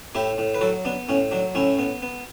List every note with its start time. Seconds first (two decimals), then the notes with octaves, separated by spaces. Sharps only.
0.15 A2 E4 G4
0.38 A2
0.54 B4
0.61 F#3 F#4 A4
0.85 B3 D4
1.09 A2 C#4
1.31 F#3 D4
1.55 A2 C#4 E4
1.79 B3
2.02 B3